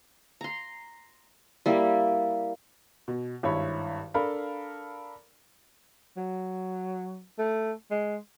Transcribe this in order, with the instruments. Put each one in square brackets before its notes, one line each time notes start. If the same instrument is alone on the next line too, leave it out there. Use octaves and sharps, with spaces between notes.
[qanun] A#5 C6
G3 A#3 E4
[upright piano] B2
G#1 G2 E4 C#5 B5
D4 A4 A#4 F5 B5
[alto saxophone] F#3
A3
G#3